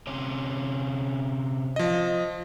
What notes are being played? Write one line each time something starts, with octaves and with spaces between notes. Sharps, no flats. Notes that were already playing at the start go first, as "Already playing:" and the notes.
C3 C#4
F3 D#5